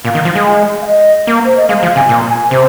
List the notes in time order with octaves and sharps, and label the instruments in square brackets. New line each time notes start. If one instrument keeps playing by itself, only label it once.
[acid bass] A#2 [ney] F5
[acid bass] D#3
F3
G#3
[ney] F5
D#5
[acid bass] A#3
[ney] C5
D#5
[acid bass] G#3 [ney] F5
[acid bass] F3 [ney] F5
[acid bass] C3 [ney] G#5
[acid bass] A#2
[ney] G#5
[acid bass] C3 [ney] C5